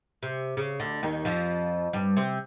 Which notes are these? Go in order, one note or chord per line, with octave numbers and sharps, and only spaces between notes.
C3
C#3
D2 D3
D#2 D#3
F2 F3
G2 G3
C3 C4